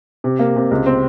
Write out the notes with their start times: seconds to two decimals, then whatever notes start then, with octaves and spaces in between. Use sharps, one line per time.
0.24 C3
0.39 A#3
0.56 C3
0.71 C#2
0.86 C4